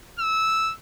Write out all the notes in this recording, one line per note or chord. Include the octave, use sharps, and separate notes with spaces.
E6